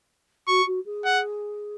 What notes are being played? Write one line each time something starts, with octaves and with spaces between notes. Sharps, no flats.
F#4 C#6
F#4
G#4
F#5